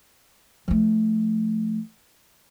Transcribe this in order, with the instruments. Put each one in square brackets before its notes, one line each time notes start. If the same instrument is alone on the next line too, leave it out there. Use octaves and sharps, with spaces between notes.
[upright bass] F3 A3